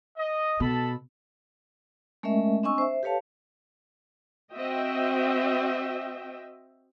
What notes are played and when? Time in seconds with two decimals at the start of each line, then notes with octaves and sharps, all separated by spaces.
0.17 D#5
0.60 B2 A4 A5 B5
2.23 G#3 A3 C#4 A#4 D#5 E5
2.63 C4 D4 D#5 G#5 C#6 E6
2.78 C5 E5
3.03 G4 A4 B4 C#5 F5 A5
4.54 C4 F#4 D#5 E5 G5